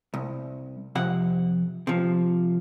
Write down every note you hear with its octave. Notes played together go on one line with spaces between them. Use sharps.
C2
F2 C3 F#5
C3 F3